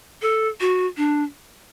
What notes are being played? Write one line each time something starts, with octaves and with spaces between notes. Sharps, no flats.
A4
F#4
D4